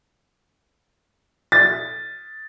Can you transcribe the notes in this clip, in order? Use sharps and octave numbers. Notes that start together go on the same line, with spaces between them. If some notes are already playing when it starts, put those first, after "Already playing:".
A6